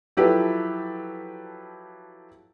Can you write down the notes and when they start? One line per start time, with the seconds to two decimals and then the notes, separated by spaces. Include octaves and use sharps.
0.17 F3 F#3 E4 G4 A4 B4